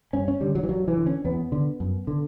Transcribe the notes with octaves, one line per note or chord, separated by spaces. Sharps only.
G2 C#4
C#4
D3 G3
F#3
E3
G2 F#3
E3
D3
C#4
E2 B3
D3
F#2
D3